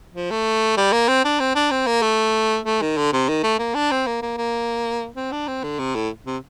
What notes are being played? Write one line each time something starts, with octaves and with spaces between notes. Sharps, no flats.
F3
A3
G3
A#3
C4
D4
C4
D4
C4
A#3
A3
A3
D#3
D3
C3
D#3
A3
A#3
D4
C4
A#3
A#3
A#3
C4
D4
C4
D3
C3
A2
C3